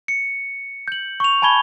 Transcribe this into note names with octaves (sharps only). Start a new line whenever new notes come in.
C#7
G6 F#7
C#6 F7
G#5 A5 B5 G#6 G7